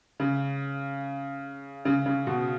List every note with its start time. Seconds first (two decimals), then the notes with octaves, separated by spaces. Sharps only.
0.20 C#3
1.85 C#3
2.06 C#3
2.27 B2